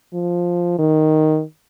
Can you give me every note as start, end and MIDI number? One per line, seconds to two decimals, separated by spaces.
0.14 0.75 53
0.79 1.42 51